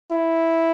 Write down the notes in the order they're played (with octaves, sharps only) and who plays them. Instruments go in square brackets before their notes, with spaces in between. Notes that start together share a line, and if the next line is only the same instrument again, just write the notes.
[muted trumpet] E4